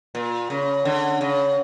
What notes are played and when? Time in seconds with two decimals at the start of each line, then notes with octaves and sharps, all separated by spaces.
0.15 A#2
0.50 C#3
0.85 D3
1.21 C#3